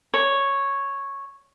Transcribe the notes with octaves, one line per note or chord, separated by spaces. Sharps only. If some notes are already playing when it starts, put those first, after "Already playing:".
C#5